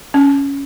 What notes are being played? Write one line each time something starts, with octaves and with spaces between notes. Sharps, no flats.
C#4